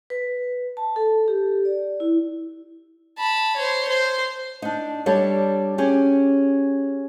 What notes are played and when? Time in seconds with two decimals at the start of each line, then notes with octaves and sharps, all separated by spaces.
0.10 B4
0.77 A5
0.96 A4
1.28 G4
1.65 D5
2.00 E4
3.18 A5 B5
3.56 C5 C#5
3.88 C5
4.62 D4 D#4
5.06 G3 D4 G4 A4 C#5
5.78 C#4 G4 G#4